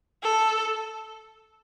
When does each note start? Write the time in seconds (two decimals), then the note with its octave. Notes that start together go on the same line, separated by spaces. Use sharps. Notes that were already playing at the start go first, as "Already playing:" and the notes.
0.22 A4